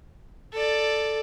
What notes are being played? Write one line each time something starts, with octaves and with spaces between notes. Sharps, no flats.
A4 D5